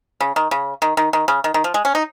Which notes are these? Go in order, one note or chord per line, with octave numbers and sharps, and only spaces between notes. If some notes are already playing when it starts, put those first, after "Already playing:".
C#3
D#3
C#3
D#3
D#3
D#3
C#3
D#3
D#3
F3
G#3
C#4
D#4